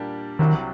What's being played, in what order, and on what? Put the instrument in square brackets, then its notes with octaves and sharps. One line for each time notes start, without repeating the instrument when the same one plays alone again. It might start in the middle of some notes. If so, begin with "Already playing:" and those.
Already playing: [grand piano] A#2 G3 A#3 D4 G4
[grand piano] C2 C3 F#3 [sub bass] D#3